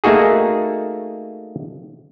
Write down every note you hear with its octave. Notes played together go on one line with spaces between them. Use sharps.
A3 A#3 D#4 F#4 G#4